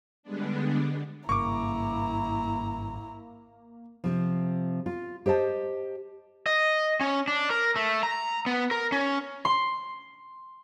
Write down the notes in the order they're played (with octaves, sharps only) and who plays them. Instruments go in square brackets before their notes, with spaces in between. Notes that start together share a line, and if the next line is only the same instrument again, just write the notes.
[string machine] D3 G3 G#3 B3 D4
[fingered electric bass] G#1 G2 C#3 [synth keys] A#3 [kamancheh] E4 A#5 [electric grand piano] C#6 D6
[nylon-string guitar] C3 F3
F4
G4 C5 D#5 A5
[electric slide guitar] D#5
C#4
D4
A#4
A3
A#5
B3
A#4
C#4
[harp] C6